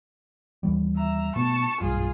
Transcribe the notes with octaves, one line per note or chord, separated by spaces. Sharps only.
D#2 E3 G3
E5 A#5
B2 A3 B3 A5 C#6
F#1 B1 G2 F4 G#4